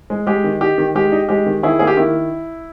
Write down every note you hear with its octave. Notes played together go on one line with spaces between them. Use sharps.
G#3
G#3 G4
D#3
D#4 G4
D#3
G#3 G4
D#4
G#3 G4
D#3
D#3 E4 G#4
A#3 G#4
G4
D#3 E4